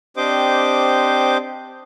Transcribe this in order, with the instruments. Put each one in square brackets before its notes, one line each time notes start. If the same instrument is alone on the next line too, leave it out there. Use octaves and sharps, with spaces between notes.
[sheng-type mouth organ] C4 D4 G4 C5 D#5 D6